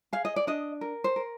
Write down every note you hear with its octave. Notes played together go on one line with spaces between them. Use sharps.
G#4 F5
D#5
D5
D4 D#5
A#4
C5
A#4